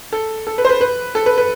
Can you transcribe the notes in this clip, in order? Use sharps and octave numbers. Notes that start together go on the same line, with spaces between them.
A4
A4
B4
C5
B4
B4
A4
B4
B4